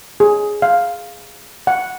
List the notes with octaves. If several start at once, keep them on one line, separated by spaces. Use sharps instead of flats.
G#4
F5
F#5